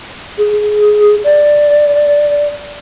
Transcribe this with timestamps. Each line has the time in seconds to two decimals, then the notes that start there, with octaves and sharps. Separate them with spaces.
0.38 G#4
1.24 D5